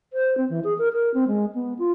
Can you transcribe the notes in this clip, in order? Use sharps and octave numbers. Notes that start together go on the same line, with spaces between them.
C5
C4
E3
G#4
A#4
A#4
C4
G#3
B3
F4